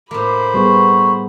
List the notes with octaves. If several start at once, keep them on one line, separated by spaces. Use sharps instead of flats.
A2 A#3 C5 B5 D6
G3 B3 G#4 C#6